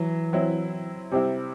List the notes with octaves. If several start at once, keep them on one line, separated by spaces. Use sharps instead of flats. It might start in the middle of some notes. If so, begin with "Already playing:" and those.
Already playing: E3 F#3
F#3 C4 E4
C3 G3 C4 E4